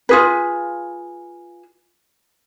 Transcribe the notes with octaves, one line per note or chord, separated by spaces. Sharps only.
F4 G#4 B4